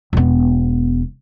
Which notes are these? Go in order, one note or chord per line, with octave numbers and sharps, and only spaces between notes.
E1 B3